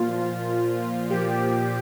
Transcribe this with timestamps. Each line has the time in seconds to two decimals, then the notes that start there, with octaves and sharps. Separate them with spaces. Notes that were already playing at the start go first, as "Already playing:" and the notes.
Already playing: A#2 F3 F4
1.10 A#2 F3 G4